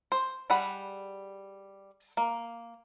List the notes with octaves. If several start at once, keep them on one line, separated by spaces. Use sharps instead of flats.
C5
G3 G#4 F#5 B5
A#3